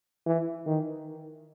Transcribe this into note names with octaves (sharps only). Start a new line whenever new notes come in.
E3
D#3